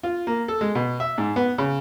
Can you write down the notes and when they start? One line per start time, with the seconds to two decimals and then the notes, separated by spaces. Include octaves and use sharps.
0.03 F4
0.27 A#3
0.48 A4
0.61 G#3
0.75 B2
1.00 E5
1.18 G#2
1.36 B3
1.58 C#3